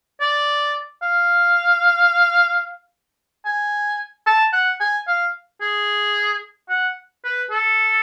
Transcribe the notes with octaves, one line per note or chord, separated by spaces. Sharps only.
D5
F5
G#5
A5
F#5
G#5
F5
G#4
F#5
B4
A4